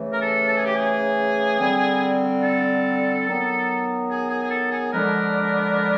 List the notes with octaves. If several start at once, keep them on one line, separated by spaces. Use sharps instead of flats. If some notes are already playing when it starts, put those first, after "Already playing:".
Already playing: C#3 E3 A3
A#4
A4
A4
G#4
G4
G#4
D3 G3 C4
A4
D#3 F#3 B3
G#4
G#4
G#4
A4
G#4
D3 F3 G#3 B3 D4 A#4